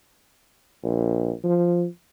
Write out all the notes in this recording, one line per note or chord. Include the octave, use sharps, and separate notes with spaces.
A#1
F3